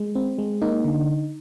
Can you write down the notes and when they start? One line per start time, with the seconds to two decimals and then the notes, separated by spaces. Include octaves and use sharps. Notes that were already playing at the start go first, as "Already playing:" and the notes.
Already playing: G#3
0.15 C4
0.39 G#3
0.62 A#3 D#4
0.85 D3